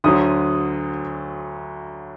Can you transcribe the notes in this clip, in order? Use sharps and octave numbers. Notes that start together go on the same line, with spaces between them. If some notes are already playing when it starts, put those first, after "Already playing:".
D2 D3 F#3 D#6